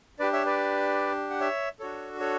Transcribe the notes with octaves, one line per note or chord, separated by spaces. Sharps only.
D4 G4 B4 D5
C#5 E5
B4 D5
F#5
C#5 E5
D4 F#4 A4 C#5
A4 C#5